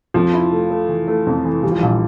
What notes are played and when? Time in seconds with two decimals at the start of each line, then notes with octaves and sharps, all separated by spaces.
0.14 F2 F3
0.33 E4
0.52 A3
0.71 A3
0.89 E3
1.08 A3
1.27 F2
1.45 E3
1.63 E3 G3
1.71 F3
1.79 A#1 G3